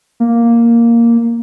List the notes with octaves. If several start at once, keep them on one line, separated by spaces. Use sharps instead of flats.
A#3